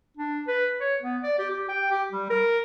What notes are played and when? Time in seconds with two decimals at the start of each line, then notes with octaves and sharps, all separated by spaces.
0.17 D4
0.47 B4
0.80 C#5
1.02 B3
1.23 D5
1.39 G4
1.51 G4
1.69 G5
1.91 G4
2.12 G3
2.30 A#4